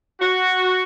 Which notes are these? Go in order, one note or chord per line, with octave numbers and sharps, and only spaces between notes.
F#4